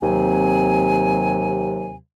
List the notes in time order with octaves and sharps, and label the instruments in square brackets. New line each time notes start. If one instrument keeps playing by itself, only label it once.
[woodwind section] D#2 C3 F#3 C4 G#5